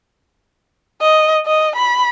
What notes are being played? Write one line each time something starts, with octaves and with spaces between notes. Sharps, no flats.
D#5
D#5
B5